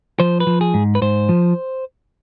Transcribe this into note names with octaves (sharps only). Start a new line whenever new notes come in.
F3 C5
B4
F3
G#4
G#2
B4
G#2 C5
F3